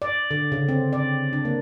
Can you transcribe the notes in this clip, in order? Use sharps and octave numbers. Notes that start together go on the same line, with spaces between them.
D5
D3
C#3
C4
D5
D4
A#3